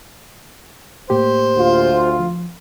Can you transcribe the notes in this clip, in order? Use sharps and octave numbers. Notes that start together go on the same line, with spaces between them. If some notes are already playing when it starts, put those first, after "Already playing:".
A2 A#3 G4 C5
D2 F4
F3